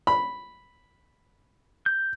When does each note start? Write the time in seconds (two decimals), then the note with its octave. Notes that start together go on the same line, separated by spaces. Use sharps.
0.07 B5
1.86 G6